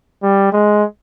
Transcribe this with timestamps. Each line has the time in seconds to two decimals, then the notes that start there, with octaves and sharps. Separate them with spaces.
0.23 G3
0.52 G#3